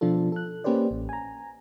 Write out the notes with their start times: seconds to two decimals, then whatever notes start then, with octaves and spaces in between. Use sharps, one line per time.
0.01 B2 F3 D4 F4 A4
0.32 A4 F#6
0.64 A#3 C#4 G4 B4 C5 D5
0.91 A1
1.09 G#5 A#5